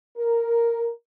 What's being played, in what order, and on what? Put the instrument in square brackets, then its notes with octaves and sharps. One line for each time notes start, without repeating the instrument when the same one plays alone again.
[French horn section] A#4